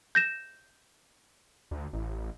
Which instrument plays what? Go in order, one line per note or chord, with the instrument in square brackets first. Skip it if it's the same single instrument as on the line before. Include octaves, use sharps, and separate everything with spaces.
[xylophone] G6 A#6 E7
[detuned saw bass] D2
A1